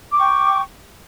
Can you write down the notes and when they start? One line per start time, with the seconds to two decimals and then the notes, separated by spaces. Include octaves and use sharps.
0.12 D6
0.15 C#6
0.18 G5